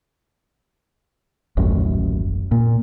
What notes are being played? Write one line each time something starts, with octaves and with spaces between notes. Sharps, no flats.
D#1 A1 F#2
A#2